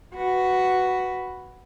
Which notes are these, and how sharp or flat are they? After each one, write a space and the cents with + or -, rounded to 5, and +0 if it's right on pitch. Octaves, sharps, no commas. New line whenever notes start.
F#4 +0 B4 +0